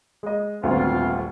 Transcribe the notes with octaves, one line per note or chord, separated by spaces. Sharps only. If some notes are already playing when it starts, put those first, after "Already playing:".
G#3 D#5
D#1 G#1 D2 B3 C4 F4